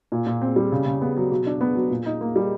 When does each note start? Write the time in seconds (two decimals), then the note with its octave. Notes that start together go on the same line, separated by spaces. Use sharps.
0.12 A#2
0.26 A#2
0.42 C4
0.56 G3
0.72 C#3
0.86 C#3
1.01 B3
1.17 F#3
1.31 B2
1.47 D4
1.61 B3
1.75 F#3
1.90 A#2
2.06 D#4
2.21 A#3
2.36 G3